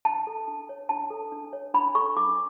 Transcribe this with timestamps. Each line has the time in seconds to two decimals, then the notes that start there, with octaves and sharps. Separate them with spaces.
0.05 D4 A5
0.27 A4
0.48 D4
0.69 C#5
0.89 D4 A5
1.10 A4
1.32 D4
1.53 C#5
1.74 D4 B5
1.95 A4 C#6
2.17 D4 D6